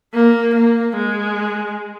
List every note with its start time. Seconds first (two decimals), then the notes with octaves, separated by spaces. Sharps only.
0.14 A#3
0.55 A#3
0.97 G#3